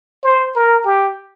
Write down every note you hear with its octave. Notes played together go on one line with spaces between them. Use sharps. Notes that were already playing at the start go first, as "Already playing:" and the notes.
C5
A#4
G4